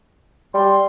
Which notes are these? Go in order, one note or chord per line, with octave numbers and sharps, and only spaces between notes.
G3 C6